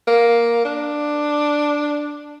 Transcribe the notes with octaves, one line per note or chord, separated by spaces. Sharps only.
A#3
D4